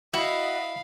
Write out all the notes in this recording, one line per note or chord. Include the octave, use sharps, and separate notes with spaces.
E4 F#4 D#5 F5 B5